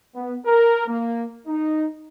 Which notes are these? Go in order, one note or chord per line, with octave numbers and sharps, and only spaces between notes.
B3
A#4
A#3
D#4